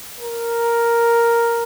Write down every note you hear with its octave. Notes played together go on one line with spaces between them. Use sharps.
A#4